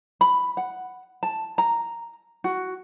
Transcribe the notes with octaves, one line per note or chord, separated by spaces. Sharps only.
B5
F#5
A5
A#5
F#4